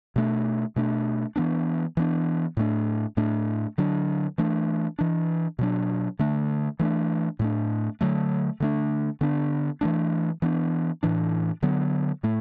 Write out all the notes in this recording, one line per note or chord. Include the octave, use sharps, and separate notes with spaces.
B2 A3 D4
B2 A3 D4
E3 B3 D4
E3 B3 D4
A2 A3 D4
A2 A3 D4
D3 F#3 D4
E3 A3 D4
E3 D4
B2 F#3 D4
D3 A3 D4
E3 A3 D4
A2 A3 D4
D3 F#3 A3
D3 A3 D4
D3 B3 D4
E3 A3 D4
E3 B3 D4
A2 E3 D4
D3 F#3 B3
A2 A3